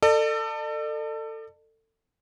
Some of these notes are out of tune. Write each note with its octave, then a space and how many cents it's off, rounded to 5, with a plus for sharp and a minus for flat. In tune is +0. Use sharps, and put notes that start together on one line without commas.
A4 +25 D5 +45